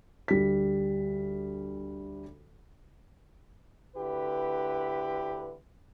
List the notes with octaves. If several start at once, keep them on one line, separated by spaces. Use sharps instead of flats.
D2 G3 B6
D2 D3 E4 G4 B4